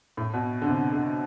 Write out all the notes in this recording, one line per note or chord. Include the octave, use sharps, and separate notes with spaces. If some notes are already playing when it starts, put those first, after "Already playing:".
A2
B2
D3
C3
D3